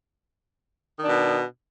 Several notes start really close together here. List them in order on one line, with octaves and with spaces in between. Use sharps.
D#3 D4 B2